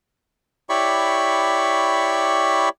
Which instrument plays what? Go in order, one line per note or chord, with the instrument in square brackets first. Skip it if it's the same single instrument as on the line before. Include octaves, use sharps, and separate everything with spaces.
[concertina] E4 G4 C#5 D5 B5 C#6